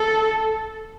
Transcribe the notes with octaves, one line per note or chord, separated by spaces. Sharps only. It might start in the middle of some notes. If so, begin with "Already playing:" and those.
Already playing: A4